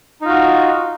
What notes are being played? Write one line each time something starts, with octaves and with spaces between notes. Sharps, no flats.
D#4 F4 F#4